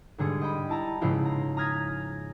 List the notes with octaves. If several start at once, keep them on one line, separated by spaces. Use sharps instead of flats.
G#2 D3 G3 G#4 C#7
D#5 G5 B5
E4 A5 A#5
G#2 C#3 F3 E4 F4
A#5
A#5 D#6 F6 G#6 A#6 B6